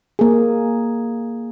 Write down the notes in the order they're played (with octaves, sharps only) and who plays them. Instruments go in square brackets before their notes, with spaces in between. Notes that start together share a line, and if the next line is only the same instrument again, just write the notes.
[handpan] A#3 G#4